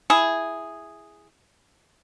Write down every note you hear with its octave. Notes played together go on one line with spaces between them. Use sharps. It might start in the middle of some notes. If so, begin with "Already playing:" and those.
E4 G#4